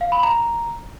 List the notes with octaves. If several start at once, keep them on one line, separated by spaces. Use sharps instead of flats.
F5
B5
A#5